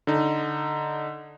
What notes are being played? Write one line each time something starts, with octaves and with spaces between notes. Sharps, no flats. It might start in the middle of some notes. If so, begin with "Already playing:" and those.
D3 D#4